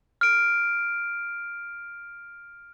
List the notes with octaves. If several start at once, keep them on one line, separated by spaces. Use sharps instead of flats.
F6 D7